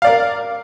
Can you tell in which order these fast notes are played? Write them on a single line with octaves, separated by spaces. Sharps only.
F5 D5 A#4